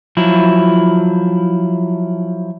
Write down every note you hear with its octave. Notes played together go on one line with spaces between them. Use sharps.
F3 F#3 E4